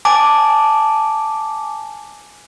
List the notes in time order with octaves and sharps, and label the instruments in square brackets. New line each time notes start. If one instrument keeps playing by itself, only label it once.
[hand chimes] G#5 A5 D6